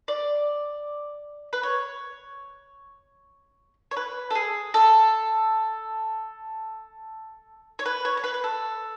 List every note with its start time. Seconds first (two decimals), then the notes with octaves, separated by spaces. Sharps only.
0.08 D5
1.53 B4
1.63 C#5
3.91 C#5
3.97 B4
4.30 A4
4.35 G#4
4.74 A4
7.79 C#5
7.85 B4
8.05 C#5
8.17 C#5
8.24 B4
8.34 B4
8.44 A4